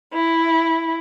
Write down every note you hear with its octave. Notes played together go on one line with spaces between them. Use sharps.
E4